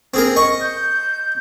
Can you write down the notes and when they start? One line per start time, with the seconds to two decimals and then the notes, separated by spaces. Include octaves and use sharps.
0.14 C4 G#4 A#4
0.36 D#5 C#6
0.62 G6